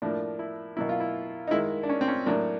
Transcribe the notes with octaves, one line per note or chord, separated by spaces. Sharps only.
A2 F3 A#3 D4
E4
B2 F#3 A#3 E4
F4
E4
D#4
D#3 G#3 E4
D4
C#4
C4
C#4
A2 F#3 A#3 D4